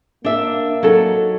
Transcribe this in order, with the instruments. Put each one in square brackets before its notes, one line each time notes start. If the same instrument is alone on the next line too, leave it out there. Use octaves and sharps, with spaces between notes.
[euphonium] A#3 [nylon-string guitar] D4 E5
[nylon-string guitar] F#3 D#4 A4